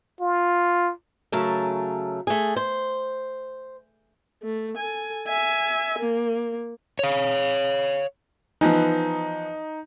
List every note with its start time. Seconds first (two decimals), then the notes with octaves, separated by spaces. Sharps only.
0.21 F4
1.32 C#3 F#3 A3 A#4 A5
2.27 A3 G#4
2.56 C5
4.43 A3
4.77 A4 G#5
5.28 E5 G#5
5.99 A#3
6.99 C#5 F5
8.61 E3 F3 B3 D#4